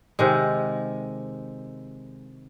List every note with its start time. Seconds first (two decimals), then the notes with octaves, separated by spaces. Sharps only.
0.19 C3 D#3 G#3